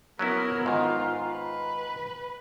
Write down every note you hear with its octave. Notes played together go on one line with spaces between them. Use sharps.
F#3 B3 C#4 E4 A#4
G#2 D#3 F4
B4